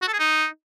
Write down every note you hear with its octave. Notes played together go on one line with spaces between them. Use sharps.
F#4
A4
G#4
D#4